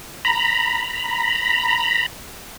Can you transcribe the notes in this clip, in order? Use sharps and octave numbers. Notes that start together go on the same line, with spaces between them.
A#5 B5